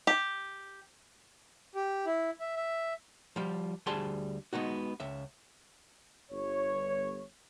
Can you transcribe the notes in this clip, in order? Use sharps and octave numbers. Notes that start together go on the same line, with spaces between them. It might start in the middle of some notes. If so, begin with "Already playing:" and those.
G4
G4
E4
E5
E5
F3 G3
D2 G3 G#4 C5 A5 C6
G#3 B3 D#4 F#4
C#2 E5
G1 C#5